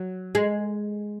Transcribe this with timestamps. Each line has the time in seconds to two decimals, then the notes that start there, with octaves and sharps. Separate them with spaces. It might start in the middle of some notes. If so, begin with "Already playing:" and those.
Already playing: F#3
0.35 G#3